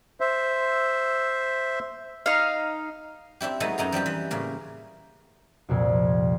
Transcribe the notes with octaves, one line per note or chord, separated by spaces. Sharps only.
C5 E5
D#4 F5
C4 D4 E4 G4
F#3 G#3 A3 B3 D#4 A4
F#2 D#4 E4 A#5
F3 G3 C4 G4
E3
A2 C#3 A#3
C2 F2 A#2